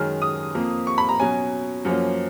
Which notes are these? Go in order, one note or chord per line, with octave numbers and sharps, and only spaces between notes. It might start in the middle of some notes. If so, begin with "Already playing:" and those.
Already playing: F#2 D#3 G#3 C#4 F6
D#6
F2 F3 A#3
C#6
B5
A#5
B2 F#3 C#4 G#5
F#2 F3 A#3 C#4